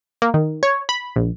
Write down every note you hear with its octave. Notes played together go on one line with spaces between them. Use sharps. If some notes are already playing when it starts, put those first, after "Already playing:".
A#3
D#3
C#5
B5
A#1